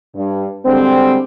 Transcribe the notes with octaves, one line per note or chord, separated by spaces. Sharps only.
G2
D3 G3 G#3 C4